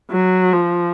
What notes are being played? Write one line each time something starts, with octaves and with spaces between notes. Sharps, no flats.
F#3
F3